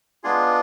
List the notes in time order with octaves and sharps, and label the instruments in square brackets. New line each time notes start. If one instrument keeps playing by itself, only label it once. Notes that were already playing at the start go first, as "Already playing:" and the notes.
[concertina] G#3 B3 D4 F4 G#4